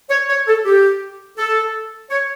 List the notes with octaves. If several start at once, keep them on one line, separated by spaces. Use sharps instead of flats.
C#5
C#5
A4
G4
A4
C#5